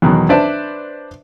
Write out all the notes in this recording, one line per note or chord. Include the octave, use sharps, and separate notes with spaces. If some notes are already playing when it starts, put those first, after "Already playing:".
E2 B2 D#3 F#3
D4 B4 C5 D5 E5 A5